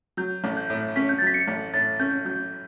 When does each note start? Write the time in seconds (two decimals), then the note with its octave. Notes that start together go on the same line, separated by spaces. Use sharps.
0.17 F#3 G6
0.44 A1
0.57 G6
0.70 A2
0.96 C#4 B6
1.09 G6
1.19 A6
1.22 F#3 B6
1.34 C#7
1.48 A1
1.74 A2 A6
2.00 C#4 G6
2.25 F#3 G6